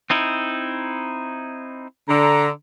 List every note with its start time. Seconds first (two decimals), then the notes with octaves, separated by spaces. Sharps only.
0.10 C4 D#4 E4
2.09 D3 A#5